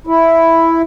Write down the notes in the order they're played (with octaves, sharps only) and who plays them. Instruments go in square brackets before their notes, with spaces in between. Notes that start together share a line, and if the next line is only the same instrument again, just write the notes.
[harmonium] E4